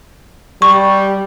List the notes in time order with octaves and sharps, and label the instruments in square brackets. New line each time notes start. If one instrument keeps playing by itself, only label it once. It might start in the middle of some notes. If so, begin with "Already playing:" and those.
[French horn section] G3 [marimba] C#6